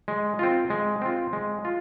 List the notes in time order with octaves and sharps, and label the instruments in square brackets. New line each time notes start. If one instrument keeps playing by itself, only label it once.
[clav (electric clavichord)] G#3
C4 F4
G#3
C4 F4
G#3
F4